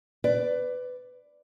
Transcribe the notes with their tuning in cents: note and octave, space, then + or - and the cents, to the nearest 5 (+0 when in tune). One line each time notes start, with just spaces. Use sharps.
B4 +20 D5 +0